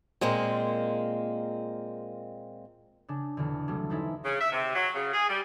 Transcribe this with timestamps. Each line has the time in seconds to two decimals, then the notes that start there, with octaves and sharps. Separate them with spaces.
0.21 A#2 G#3 A#3 C4
3.08 C#3 D4
3.37 E2 B2 D3
3.68 C2 F#3 G3 A3
3.90 C#4 D#4 E4 A4 B4 C5
4.24 C#3
4.40 E5
4.52 C3
4.74 F#3
4.94 C#3
5.12 G#4
5.28 G3